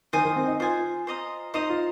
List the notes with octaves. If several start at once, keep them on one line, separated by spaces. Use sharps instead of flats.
D#3 C5 G#5 D#6
D#3
C4
D#4
F4 C5 G#5 D#6
C5 D#5 A#5 D#6
D#4 C5 D#5 A#5 D#6
F4